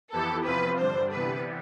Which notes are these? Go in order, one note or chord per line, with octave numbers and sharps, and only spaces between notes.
F2 E3 B3 E4 G4 A4
E2 C3 F3 C4 F4 B4
G2 D3 G3 D4 C5
C3 E3 G3 B3 B4